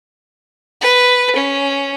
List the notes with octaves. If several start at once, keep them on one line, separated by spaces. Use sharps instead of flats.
B4
C#4